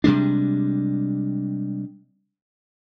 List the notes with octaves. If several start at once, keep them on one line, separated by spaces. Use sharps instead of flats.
C3 G3 G#3 D4